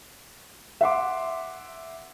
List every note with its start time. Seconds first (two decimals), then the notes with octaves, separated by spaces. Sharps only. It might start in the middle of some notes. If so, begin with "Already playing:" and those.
0.81 E5 F#5 C6 D6